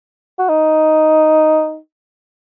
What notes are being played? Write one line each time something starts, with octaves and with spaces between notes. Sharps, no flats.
F#4
D#4